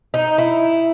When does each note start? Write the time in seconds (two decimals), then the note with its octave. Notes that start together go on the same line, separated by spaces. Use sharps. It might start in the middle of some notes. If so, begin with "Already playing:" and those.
0.14 D#4
0.38 E4